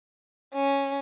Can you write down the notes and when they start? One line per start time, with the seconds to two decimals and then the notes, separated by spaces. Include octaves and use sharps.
0.54 C#4